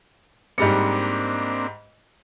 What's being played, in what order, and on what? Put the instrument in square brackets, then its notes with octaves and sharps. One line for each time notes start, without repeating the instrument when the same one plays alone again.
[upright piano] G#2 G3 C#7 [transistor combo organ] A#3 C4 D4